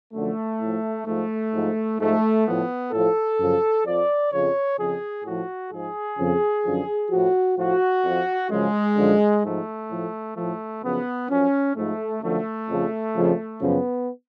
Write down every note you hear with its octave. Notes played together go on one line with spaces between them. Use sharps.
F#2 D3 F3 A3
A2 F3
G#2 F3 A3
G#2 F3
G#2 F3 A3
A2 F3 B3
A2 F3 A4
F#2 C#3 F3
F2 F3 D5
F2 C#3 F3 C#5
F2 C#3 F3 G#4
A2 F3 F#4
G#2 F3 G#4
F2 C#3 F3
F#2 D3 F3
A2 F3 F#4
A2 F3 F#4
F2 F3
F#2 C#3 F3 G#3
F#2 D3 F3
G#2 F3 A3
A2 F3
A2 F3 A3
F#2 C#3 F3 B3
F#2 F3 C#4
G#2 F3 A3
F#2 D3 F3 A3
F2 C#3 F3
F2 C#3 F3
F#2 C#3 F3 B3